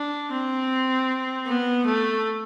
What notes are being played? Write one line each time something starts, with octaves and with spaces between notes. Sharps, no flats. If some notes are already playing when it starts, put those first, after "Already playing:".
Already playing: D4
C4
B3
A3